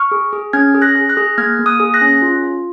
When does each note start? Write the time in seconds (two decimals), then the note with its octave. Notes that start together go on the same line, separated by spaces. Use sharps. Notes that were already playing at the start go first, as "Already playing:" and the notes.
Already playing: C#6 F6
0.11 G#4
0.33 G#4
0.53 C#4 F6 G#6
0.74 G#4
0.82 F#6 A#6
0.96 G#4
1.09 F#6 A#6
1.17 G#4
1.38 A#3 F6 G#6
1.59 A#3
1.66 D#6 F#6
1.80 G#4
1.94 F#6 A#6
2.02 C#4
2.22 F4
2.44 F4